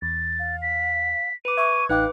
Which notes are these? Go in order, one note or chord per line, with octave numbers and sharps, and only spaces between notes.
E2 A6
F5
B6
B4 D6 D#7
E5 C#6 G#6
A1 D#4 B4 F5 G5 D6 F#6